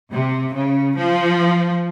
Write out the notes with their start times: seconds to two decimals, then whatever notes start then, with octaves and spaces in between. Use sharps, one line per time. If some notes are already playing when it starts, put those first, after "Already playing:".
0.11 C3
0.53 C#3
0.96 F3